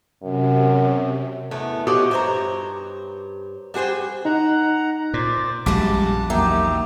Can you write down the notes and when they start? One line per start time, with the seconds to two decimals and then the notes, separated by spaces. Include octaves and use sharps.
0.22 F#2 C3
1.51 E2 A3 B3
1.87 B2 F3 F#4 G4 C#5 D#5
2.11 G2 C5 C#5 A5 A#5
3.74 G3 F#4 G#4 C5 G5
4.25 D#4 F#5 A#5
5.14 A#2 C5 D5
5.66 A#1 F#2 G3 G#3 F#4 A5 D6
6.30 E2 F#3 A#3 D#4 G4 E5